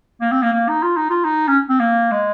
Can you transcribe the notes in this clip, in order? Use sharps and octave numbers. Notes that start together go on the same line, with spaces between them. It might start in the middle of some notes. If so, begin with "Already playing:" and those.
A#3
C4
A#3
A#3
D#4
F4
D#4
F4
D#4
C#4
C4
A#3
G#3